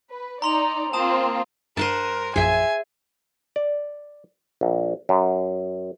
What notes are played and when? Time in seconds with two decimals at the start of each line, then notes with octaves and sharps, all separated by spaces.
0.10 B4
0.42 D#4 D5 A#5 C6 F7
0.93 A#3 C4 F4 A5 D#6 E7
1.77 G2 A#4 C5 F#5 A5 D#7
2.36 A#1 F#2 F3 G#4 E5 G#5
3.56 D5
4.61 A#1
5.09 F#2